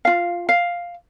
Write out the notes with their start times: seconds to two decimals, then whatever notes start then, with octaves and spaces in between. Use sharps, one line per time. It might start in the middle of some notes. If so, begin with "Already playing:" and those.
0.05 F4 F5
0.49 F5